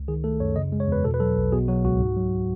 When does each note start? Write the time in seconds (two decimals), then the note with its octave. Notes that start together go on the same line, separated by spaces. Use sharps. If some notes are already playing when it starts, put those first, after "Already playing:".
Already playing: C#2
0.08 D#3 G#4
0.24 A3 A4
0.40 F#2 C#5
0.56 C#3 D#5
0.72 G#3
0.80 C#5
0.88 E2 B4
1.04 B2 A4
1.14 B4
1.20 F#3 A4
1.37 B1
1.52 B2 G#4
1.68 F#3 F#4
1.84 C#2 F#4
2.00 G#2
2.16 F#3